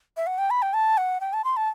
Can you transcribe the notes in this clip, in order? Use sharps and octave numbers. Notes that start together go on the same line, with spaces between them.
E5
F#5
G5
B5
G5
A5
F#5
G5
A5
C6
A5